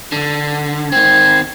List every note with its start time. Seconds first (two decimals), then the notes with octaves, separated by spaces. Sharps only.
0.12 D3
0.92 D#3 C4 G#6